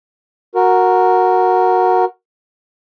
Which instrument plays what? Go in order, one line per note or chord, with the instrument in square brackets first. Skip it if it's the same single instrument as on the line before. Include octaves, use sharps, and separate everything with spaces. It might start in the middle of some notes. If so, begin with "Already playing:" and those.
[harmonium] F#4 A#4